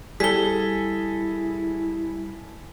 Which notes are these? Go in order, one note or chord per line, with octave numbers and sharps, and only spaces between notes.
G3 E4 G#4 A4 B6 G7